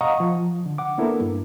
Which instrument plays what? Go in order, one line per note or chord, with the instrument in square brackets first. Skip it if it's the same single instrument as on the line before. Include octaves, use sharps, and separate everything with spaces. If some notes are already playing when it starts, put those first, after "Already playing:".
[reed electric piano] D#5 F5 F#5 A#5 C#6 D#6
F3
D3
F#5 D6
A#3 B3 D4 E4 A4 A#4
G2